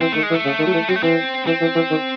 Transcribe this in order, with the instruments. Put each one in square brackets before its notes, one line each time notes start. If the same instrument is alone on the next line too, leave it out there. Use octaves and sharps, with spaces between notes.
[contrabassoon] E3 [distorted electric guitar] C4
[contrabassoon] D#3 [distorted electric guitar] A3
[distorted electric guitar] G#3
[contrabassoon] E3
[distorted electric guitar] A3
[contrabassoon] C#3
D#3
F#3
E3
[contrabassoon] F#3 [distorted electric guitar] C4
[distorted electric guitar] A3
[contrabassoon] E3 [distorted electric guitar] C4
[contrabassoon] E3 [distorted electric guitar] C4
[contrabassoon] E3
E3
D#3